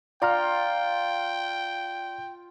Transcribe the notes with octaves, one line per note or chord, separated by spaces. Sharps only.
F4 D5 G5 A#5 F6